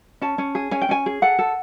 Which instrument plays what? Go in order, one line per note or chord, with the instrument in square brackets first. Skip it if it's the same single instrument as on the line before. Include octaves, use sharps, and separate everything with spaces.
[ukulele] C#4 A5
C#4
G#4
C#4 G#5
G5
C#4 G#5
G#4
A4 F#5
A4